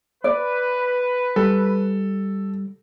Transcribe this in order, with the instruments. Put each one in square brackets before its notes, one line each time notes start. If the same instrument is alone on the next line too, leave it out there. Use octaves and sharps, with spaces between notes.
[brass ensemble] B4 [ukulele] D5
[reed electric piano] G3 [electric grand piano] A4